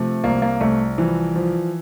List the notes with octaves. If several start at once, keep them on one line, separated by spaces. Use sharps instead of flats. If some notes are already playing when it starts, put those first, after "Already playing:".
Already playing: C3 F3 A3
C2 A#3
A#3
C2 A3
E3 F3
F3